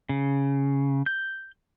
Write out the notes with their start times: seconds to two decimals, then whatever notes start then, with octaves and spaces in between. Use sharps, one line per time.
0.09 C#3
1.06 G6